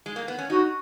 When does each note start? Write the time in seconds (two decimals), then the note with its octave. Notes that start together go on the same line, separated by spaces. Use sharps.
0.06 G#3
0.16 A#3
0.28 B3
0.39 C#4
0.50 D#4 F#4